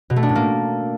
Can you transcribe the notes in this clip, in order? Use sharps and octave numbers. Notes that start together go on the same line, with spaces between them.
B2
A3
D4
A2
A#3